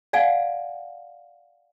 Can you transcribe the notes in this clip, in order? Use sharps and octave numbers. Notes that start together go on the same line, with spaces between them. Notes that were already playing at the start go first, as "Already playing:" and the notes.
D5 F5 F#5 G#5